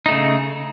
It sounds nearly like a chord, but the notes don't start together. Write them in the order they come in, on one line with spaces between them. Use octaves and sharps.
D#4 A3 C#3